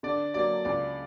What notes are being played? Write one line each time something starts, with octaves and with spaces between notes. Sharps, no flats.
D3 D5
F#3 A#3 D5
C#2 D5